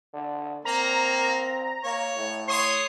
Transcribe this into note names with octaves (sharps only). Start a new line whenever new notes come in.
D3
A#3 C4 A#5
A#3 C#5
A2
C#5 C6 D#6 C7